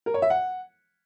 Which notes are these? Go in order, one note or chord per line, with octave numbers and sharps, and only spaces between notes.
A#4
C#5
E5
F#5